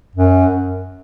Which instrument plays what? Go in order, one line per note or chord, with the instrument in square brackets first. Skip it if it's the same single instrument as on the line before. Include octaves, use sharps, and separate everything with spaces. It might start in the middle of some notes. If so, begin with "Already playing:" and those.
[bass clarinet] F#2